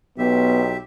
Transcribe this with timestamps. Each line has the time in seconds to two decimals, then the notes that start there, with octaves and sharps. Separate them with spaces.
0.18 B1 B3 G4 E5